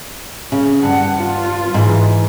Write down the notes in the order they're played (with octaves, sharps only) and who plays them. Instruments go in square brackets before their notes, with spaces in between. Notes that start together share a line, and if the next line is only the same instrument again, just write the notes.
[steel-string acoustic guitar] C#3 [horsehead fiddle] C#4
[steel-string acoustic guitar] G2 [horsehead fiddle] F#5
[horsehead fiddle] F4
[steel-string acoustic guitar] G#2 E3